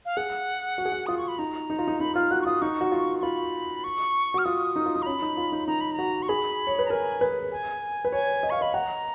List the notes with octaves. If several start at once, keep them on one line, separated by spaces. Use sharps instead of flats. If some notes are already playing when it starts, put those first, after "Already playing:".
F5
G#4 F#5
F#4
G#4
F#4
F4 D#6
C#6
B5
D#4 A#5
D#4
F4
D#4
D#4 B5
F4 F6
F#4 F#6
C#6
F4 D#6
D#4 C#6
F#4
F4
C#6
F4 B5
C#6
F#4 F6
F4 D#6
D#4
F4
D#4
A#5
C#4 B5
D#4
F4
D#4
D#4 A#5
B5
A#5
F#4
C#6
G#4 B5
C#5
B4
A#5
A#4 G#5
B4
G#5
B4
C#5 G#5
D#5
F5 C#6
D#5 B5
F#5 A#5